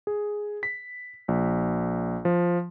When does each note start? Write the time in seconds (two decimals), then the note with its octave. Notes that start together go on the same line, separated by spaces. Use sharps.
0.07 G#4
0.63 B6
1.28 A#1
2.25 F3